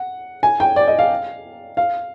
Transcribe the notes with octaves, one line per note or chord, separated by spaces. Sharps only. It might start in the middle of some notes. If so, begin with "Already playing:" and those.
Already playing: F#5
G#5
G5
D5
D#5
F5
F5